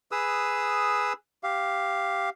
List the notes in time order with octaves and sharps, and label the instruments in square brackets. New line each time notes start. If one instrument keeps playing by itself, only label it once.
[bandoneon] G#4 B4 D#6 E6
G4 F5